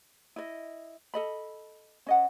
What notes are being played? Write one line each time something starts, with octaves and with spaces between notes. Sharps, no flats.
E4 D#5
A4 D#5 B5
C#4 D#5 F#5